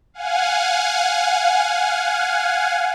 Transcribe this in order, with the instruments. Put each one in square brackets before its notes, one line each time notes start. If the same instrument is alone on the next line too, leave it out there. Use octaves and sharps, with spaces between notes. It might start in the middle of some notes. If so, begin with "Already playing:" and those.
[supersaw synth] F5 F#5 G#5